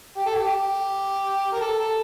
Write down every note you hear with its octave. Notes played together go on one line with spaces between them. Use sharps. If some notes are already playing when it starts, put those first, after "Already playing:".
G4
A4
G4
A#4
A4
A4